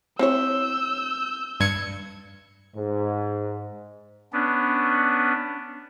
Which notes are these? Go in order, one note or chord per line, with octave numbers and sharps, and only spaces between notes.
C4 E4 C#5 E6 G6
G2 G#6 C#7
G#2
B3 C#4 D4